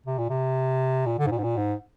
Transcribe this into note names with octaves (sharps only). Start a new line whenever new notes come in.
C3
A#2
C3
A#2
D3
G#2
A#2
G#2
A#2
G#2